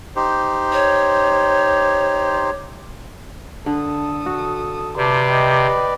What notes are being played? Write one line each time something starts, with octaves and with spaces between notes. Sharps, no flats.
D#4 G4 C5
C#5
D3 A4 D#6
F#4
C3 B4 D5 A5 C6
D#5 G5